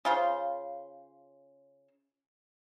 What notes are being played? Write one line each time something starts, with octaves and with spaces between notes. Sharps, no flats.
C#3 F4 C5